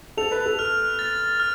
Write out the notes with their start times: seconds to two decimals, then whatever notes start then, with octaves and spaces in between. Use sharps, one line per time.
0.17 A4 F7
0.31 B4
0.46 A4
0.59 F6
0.99 A6
1.40 F6